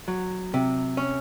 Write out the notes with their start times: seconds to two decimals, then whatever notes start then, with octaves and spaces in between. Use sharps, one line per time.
0.08 F#3
0.54 C3
0.97 C#4